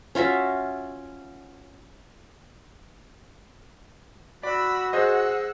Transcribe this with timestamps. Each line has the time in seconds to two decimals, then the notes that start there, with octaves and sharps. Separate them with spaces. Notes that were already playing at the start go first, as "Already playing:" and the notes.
0.15 C#4 F4 F#4 E5
4.43 F#4 D5 B5 E6
4.93 G#4 C5 D#5 F#5 E6